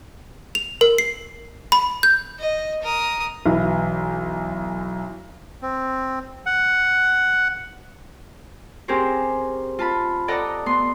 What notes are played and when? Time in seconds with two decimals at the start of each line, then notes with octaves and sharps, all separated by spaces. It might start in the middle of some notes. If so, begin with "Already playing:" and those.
0.55 F7
0.81 A#4
0.98 C7
1.72 B5
2.03 G6
2.39 D#5
2.83 A#4 D#6
3.46 B1 E3
5.62 C4
6.46 F#5
8.88 C4 C#4 G4 G#4 A#4 C5
9.79 F4 A5 B5
10.28 A4 D5 D#5 F#5 A#5
10.66 B3 C6